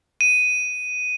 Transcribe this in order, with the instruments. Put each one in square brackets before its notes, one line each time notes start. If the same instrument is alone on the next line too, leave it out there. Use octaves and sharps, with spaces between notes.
[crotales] D#7